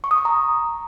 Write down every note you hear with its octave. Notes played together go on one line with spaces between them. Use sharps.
C#6
D#6
C#6
A#5